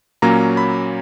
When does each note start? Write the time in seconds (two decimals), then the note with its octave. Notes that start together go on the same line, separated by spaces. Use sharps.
0.22 A#2 F#3 A#3 C#4 A#5
0.57 B5